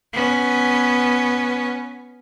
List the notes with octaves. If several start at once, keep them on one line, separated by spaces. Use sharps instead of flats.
B3 C#4